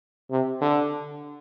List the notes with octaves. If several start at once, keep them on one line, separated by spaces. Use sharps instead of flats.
C3
D3